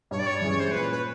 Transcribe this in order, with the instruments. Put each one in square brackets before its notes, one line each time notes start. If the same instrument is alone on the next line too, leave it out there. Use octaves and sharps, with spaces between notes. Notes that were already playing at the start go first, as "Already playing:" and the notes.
[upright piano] G2 [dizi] C#5
[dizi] D5
C#5
[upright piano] E3 G#3 C#4
[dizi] C5
[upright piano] A#2 [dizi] B4
[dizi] B4